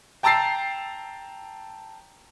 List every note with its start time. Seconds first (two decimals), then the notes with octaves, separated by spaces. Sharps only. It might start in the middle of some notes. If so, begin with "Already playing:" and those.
0.23 G5 A5 A#5 E6 A6 C7